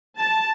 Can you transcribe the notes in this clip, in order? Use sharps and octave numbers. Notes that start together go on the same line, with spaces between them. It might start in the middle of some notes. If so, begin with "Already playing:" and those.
A5